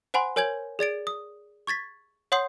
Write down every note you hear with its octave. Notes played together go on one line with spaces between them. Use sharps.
C5 F#5 G#5 B5 C6
A#4 C#5 G#5 G6 G#6 F#7
G#4 D5 A6 D7
D#6
C#6 G#6 A6 B6
C#5 F#5 C6 D#6 G6 C7